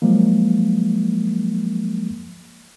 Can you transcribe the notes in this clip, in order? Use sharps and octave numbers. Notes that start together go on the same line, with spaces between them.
F3 F#3 G#3 A#3